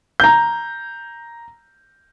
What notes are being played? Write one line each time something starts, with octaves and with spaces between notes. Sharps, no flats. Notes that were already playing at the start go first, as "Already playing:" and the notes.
A#5 G6